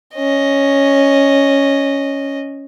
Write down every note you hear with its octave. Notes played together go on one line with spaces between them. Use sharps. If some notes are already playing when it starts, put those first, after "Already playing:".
C#4 D#5